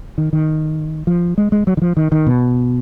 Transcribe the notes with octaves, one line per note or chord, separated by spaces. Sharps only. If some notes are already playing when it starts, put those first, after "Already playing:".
D#3
D#3
F3
G#3
G#3
F#3
D#3
F3
D#3
D#3
B2